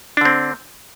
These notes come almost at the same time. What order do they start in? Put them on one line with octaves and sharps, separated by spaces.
D4 D3 C4